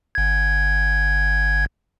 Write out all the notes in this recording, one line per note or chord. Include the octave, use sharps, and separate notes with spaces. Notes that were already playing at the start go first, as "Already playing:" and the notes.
G1 G#6